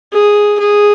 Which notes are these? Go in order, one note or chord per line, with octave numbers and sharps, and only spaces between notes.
G#4
G#4